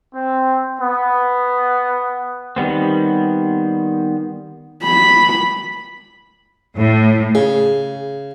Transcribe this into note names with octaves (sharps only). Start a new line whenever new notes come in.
C4
B3
D#3 G3 B3 C4
B5
A2
C#3 G#4